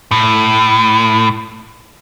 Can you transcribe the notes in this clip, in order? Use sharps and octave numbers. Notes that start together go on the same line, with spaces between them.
A2